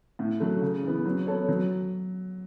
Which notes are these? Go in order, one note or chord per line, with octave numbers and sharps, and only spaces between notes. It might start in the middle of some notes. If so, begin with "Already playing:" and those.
A2
F#3 A3
C#3
E3 B3
F#3
B3 A4 C#5
F#3